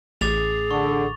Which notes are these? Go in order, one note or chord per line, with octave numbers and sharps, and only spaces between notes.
A1 G#4 D6 A6 F7
D3 C#6